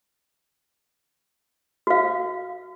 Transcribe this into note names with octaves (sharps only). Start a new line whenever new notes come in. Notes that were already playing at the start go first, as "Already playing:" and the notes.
F#4 F5